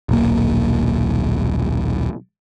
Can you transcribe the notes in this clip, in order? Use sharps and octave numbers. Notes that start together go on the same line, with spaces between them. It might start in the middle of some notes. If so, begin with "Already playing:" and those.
D#1 B1 A#3